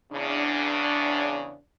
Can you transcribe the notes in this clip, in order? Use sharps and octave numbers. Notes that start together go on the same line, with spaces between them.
E2 C#3 D4